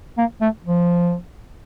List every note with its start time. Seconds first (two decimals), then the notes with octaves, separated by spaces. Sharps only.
0.18 A#3
0.41 A3
0.66 F3